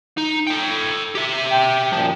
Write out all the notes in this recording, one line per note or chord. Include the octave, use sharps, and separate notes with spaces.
D#4
A4 G5
G4 E5
G5
F#2 A#2 F3